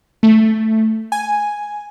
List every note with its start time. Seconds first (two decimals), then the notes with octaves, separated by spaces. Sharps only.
0.23 A3
1.12 G#5